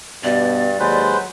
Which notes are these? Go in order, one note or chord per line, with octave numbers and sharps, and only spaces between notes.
G2 B2 D5
D#2 F#3 G#3 B4 C5